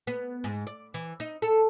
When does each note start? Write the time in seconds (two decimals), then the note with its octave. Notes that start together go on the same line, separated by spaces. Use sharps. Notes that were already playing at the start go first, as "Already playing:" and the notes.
0.07 B3
0.44 G#2
0.67 D5
0.94 E3
1.20 D#4
1.42 A4